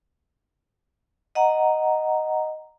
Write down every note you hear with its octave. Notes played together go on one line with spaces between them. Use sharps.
D#5 F#5 A#5